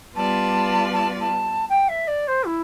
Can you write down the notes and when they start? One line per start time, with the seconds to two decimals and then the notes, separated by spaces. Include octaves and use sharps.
0.16 G3 B3 F4 B4 D5 A5
0.93 A5
1.20 A5
1.69 G5
1.88 E5
2.07 D5
2.27 C5
2.46 E4